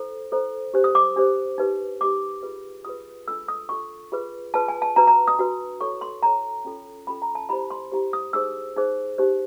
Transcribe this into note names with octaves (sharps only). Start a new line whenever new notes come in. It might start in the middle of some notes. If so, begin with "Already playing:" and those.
Already playing: E4 A4 C5
E4 A4 C5
D4 G4 C5
D#6
D6
D4 G4 C5
D#4 G4 B4
D#4 G4 B4 D6
F4 G#4 B4
F4 G#4 B4 D#6
D4 F4 A4 E6
D#6
D4 F4 A4 C#6
F4 G#4 B4
F4 G#4 B4 A5
G#5
A5
D4 F#4 B4 A#5
A#5
D#6
D4 F#4 B4
E4 A4 C#5 C#6
C6
E4 A4 C#5 A#5
C#4 F4 A4
C#4 F4 A4 B5
A#5
A5
E4 G4 C5 B5
C6
E4 G4 C5
D#6
D#4 G#4 C5 E6
D#4 G#4 C5
D#4 G4 C5